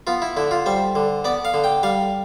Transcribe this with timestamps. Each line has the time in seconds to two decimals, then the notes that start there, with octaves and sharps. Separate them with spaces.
0.07 B3 F4
0.22 E4
0.37 D3 E4
0.51 F4
0.66 G3 C5
0.95 D3
1.25 B3 D5
1.45 F5
1.54 D3
1.64 G5
1.83 G3 F5